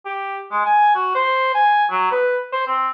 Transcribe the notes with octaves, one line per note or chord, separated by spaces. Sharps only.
G4
G#3
G#5
F#4
C5
G#5
F#3
B4
C5
C4